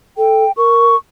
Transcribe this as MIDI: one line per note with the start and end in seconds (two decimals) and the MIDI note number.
0.17 0.44 69
0.17 0.52 79
0.57 0.95 70
0.57 0.96 85